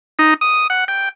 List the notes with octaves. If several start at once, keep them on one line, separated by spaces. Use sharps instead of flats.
D#4
D#6
F#5
G5